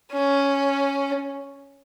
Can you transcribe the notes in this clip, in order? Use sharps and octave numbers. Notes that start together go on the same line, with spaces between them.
C#4